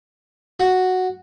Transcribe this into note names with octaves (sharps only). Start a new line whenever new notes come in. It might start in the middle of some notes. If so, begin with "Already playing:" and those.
F#4